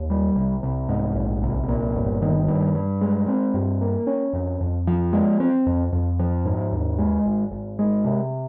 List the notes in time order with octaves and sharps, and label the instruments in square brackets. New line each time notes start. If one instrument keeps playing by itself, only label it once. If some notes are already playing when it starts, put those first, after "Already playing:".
Already playing: [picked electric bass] D#2
G3
C2
C2
G#2
A#1
C2
A#2
G1
D#3
G2
G2
G#3
C4
G2
A#3
C#4
F2
F2
F3
G#3
C4
F2
F2
F3
G#2
D#2
G#3
G#1
G#1
G#3
C3